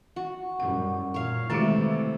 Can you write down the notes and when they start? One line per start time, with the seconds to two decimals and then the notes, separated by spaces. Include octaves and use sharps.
0.16 F#4
0.60 F#2 G3 F#5
1.14 A#2 C#5 F5
1.50 C3 D#3 E3 G#3 A3 F#4 A4 A5